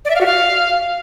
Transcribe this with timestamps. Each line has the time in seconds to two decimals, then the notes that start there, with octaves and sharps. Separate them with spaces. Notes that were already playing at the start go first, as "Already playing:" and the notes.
0.05 D5
0.10 E5
0.15 F5
0.21 F#4
0.26 F5